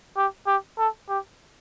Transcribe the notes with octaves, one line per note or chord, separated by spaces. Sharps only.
G4
G4
A4
G4